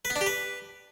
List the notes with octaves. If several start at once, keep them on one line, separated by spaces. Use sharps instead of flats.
B4
B3
D4
G4
B4